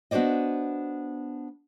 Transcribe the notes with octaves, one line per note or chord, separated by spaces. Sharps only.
B3 D4 F#4 C5 D5 D#5